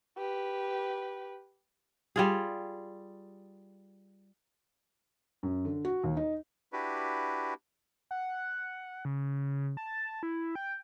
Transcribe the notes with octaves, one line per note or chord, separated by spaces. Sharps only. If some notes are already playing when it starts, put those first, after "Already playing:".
G4 B4
G3 F4 G#4
F#2
D3
F#4
D#2
D#4
D4 E4 F#4 G4 B4
F#5
C#3
A5
E4
G5